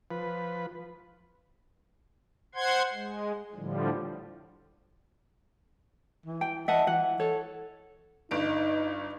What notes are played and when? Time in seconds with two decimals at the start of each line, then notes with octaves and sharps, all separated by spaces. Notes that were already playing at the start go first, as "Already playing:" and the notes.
0.11 F3 B4
2.55 C5 F#5 C6 G#6
2.93 G#3
3.55 A2 D3 F3 G3
6.26 E3
6.41 G5
6.68 D#5 E5 F#5 A5
6.87 E3 F#5
7.20 A4 C#5
8.31 G1 G2 D#4 D7